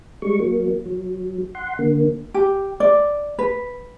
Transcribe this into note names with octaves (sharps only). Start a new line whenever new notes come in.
G3 G#3 C#6
F#3 A#3
F#3
F#5 C6
D3 A#3
G4
D5
B4